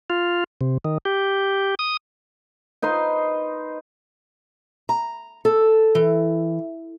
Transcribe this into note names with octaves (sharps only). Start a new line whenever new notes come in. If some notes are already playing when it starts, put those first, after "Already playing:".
F4
C3
D#3
G4
D#6
D#4 B4 C5 C6
A#5
A4
E3